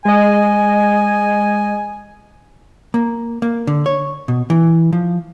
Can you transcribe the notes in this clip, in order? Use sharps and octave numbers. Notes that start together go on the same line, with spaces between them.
G#3 D#5 G#5
A#3
A#3
D3
C#5
B2
E3
F3